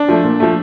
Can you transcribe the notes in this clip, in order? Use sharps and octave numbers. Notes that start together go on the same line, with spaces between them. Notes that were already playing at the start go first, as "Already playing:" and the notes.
Already playing: D4
F3 A3
A#2
F3 A3